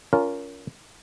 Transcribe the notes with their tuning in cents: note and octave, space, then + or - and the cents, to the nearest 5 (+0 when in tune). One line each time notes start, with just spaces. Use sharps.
C#4 +30 F4 +0 A#4 +0